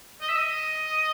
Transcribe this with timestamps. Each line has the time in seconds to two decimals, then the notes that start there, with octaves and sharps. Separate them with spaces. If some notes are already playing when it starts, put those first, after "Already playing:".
0.21 D#5
0.28 E5
0.36 D#5